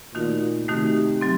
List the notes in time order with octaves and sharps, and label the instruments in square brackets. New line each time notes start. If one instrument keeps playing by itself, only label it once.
[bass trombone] A#2 [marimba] D#3 A3 D#4 F#4
[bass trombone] C3 [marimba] D#3 A3 D#4 F#4
[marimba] F#3 C4